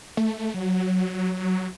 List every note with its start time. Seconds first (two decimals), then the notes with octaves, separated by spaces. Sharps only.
0.17 A3
0.54 F#3